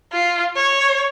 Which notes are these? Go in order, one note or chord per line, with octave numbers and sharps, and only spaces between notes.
F4
C#5